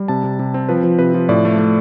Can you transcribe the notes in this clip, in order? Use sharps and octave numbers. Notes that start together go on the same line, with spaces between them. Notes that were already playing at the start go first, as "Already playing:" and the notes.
Already playing: G3
C3 A5
C3
C3
C4
F3 B4
F3
C3 B4
F3
A2 D5
A3
A3